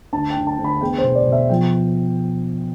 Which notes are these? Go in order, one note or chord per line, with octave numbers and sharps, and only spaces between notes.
D2 A5
G5
D2
A5
D2
B5
E2 G5
C5
B2
D5
B2
E5
F3 G5